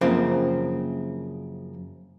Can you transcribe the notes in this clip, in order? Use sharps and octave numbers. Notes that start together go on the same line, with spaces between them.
F#2 C#3 F3 A#3 C4